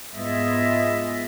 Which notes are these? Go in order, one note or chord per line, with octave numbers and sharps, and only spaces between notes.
G#2 B3 F4 G#4 D#5 E5